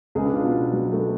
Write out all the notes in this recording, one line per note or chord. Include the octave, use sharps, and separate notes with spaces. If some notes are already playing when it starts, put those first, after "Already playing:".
C#2 G#4
D4
F4
B2
F#3 B3
A3